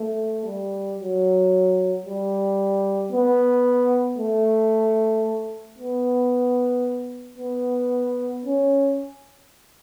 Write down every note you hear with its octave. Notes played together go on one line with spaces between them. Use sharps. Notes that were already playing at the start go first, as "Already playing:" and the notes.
Already playing: A3
G3
F#3
G3
B3
A3
B3
B3
C#4